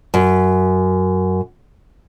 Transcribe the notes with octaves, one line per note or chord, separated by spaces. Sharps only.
F#2